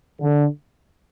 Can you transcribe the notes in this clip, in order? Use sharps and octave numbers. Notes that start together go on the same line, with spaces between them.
D3